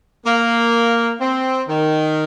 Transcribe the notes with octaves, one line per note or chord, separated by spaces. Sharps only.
A#3
C4
D#3